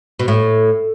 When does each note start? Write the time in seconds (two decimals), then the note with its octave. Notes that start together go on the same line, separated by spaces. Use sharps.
0.19 B2
0.28 A2